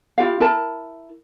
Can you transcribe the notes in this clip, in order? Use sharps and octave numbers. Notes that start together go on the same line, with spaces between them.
E4 F4 G4 F5
E4 A#4 A5